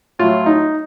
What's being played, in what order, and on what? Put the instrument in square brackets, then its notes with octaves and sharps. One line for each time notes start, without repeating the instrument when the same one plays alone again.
[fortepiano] A2 F#3 F4
D#4